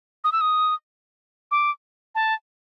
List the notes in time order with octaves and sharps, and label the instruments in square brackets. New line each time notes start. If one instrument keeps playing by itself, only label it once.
[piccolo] D#6
E6
D#6
D6
A5